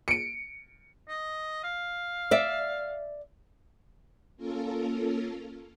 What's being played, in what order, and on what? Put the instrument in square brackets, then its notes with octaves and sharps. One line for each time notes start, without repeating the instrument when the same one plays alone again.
[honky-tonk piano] C#7 D7
[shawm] D#5
F5
[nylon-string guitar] D5 E5
[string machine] A#3 C#4 F4 A4 A#4